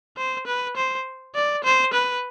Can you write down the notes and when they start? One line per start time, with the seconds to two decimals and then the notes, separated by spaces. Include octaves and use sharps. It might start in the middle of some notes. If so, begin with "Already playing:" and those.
0.17 C5
0.47 B4
0.76 C5
1.35 D5
1.64 C5
1.94 B4